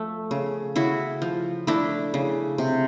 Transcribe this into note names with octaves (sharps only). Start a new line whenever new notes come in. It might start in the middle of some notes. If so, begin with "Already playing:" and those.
Already playing: F3 A3
C#3
C#3 E4 F#4
F3
A3 D4 E4
C#3
C3